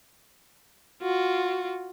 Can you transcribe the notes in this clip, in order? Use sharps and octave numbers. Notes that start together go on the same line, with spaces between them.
F4 F#4